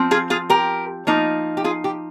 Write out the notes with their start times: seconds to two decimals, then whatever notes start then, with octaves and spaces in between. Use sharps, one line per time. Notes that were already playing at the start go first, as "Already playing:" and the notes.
Already playing: F3 C4
0.11 F4 G#4
0.30 F4 G#4
0.50 G4 A#4
1.07 F3 A#3 D#4
1.57 G4
1.64 F4 G#4
1.84 G4